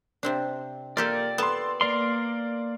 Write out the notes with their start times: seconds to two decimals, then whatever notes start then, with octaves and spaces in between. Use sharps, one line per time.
0.23 C3 C4 D4
0.97 A#3 F4 G4 A4 A#4 D5
1.38 B3 A4 A5 C6
1.81 A#3 A#4 D5 C6 C7